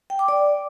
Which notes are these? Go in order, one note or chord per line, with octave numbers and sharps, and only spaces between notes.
G5
D6
D5